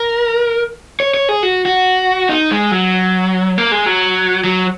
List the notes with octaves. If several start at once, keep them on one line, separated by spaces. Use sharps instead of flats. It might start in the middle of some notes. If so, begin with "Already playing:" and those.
Already playing: A#4
C#5
C#5
G#4
F#4
F#4
D#4
G#3
F#3
A#3
G#3
F#3
F#3